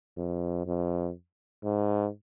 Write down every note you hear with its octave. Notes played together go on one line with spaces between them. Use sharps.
F2
F2
G#2